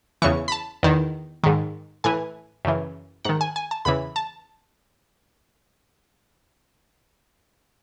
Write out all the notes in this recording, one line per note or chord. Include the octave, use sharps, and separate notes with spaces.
E2 C#3 E3 C#6
B5
A5
E2 D#3
G#2 D#3
A2 E3 G#5
F#2 C#3 E3
G#2 D#3 F#5
G#5
G#5
A5
E2 C#3 E3 B5
A5